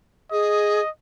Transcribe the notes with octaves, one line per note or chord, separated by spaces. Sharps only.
G#4 D#5